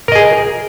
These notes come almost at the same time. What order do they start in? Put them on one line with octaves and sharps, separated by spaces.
A#4 D#5 G#4